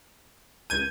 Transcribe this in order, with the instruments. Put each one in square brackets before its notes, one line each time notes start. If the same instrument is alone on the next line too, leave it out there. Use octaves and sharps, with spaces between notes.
[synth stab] C#2 G#6 D#7 [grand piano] G6